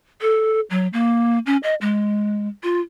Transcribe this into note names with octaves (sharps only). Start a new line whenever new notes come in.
A4
F#3
A#3
C#4
D#5
G#3
F4